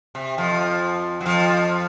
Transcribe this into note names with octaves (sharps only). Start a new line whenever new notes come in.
C3
F2 F3
F#3
F2 F3